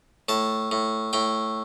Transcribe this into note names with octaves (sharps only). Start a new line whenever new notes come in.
A2 A5
A2
A2 G5